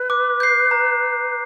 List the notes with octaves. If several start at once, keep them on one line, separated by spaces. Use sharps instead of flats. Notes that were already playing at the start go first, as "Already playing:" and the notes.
Already playing: B4
D6
G6 C7
A#5